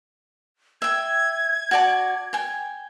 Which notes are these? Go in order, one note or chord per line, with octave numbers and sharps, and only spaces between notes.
E5 G5 G#6
F#4 D5 A5
G5 G#5